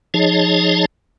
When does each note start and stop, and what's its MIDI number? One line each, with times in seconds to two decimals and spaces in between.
0.14 0.86 53
0.14 0.86 63
0.14 0.86 68
0.14 0.86 73
0.14 0.86 75
0.14 0.86 81